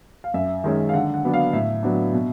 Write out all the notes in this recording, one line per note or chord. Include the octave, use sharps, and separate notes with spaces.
F5
F#2 E5
D#3 G#3 C#4
F5
D3 F#5
F#5
F#3 B3 D4
F5
A2 E5
F#3 B3 D4
B2